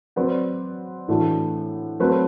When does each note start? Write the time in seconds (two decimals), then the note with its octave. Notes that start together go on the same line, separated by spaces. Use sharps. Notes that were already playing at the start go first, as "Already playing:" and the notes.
0.16 F#3 C4 F#4 B4 D5
1.08 A2 E3 A3 D4 F#4
2.00 F#3 A3 C4 F#4 B4